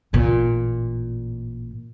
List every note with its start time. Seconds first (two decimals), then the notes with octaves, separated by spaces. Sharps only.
0.13 A1 A#2